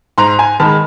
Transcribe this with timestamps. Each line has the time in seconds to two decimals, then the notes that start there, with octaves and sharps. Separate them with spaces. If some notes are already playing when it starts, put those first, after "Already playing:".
0.18 G#2 A#5 C6
0.39 G#5 A#5
0.60 D#3 G#3 A5 B5